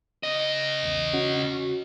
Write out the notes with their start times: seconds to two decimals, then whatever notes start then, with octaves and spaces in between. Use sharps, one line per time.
0.23 C#3 D#5
0.82 B1 E2
1.13 C#4 F#4